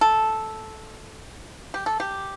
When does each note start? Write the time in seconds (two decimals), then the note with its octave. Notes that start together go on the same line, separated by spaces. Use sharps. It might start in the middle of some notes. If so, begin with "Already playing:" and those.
0.01 A4
1.74 G4
1.86 A4
2.00 G4